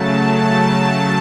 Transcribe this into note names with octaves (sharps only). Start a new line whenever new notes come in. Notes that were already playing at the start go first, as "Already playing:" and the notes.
Already playing: C#3 F#3 A3 A5
A5